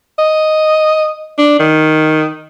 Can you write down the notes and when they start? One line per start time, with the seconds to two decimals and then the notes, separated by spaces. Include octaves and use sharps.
0.19 D#5
1.38 D4
1.59 D#3